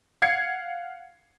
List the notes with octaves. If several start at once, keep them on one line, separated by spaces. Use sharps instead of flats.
F5 F#5 G#6 C7 C#7